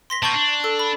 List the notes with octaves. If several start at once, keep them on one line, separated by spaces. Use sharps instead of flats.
C6 A#6 B6
B2 A5 C#6 G6
D4
A4
B5